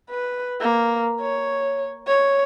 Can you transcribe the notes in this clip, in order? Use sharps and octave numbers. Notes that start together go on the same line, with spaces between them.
B4
A#3
C#5
C#5